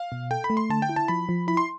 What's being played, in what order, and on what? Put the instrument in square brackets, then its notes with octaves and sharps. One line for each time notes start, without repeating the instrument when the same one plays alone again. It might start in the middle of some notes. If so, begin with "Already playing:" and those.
Already playing: [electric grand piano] F5
[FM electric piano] B2
[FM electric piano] A4 [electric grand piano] G5
[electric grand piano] B5
[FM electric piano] A3
[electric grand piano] C6
[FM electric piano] D3 [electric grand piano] A5
[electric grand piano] G5
[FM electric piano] E4
[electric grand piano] A5
[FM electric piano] F3 [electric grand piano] B5
[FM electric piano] F3
[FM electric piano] E4 [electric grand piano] B5
[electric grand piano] C6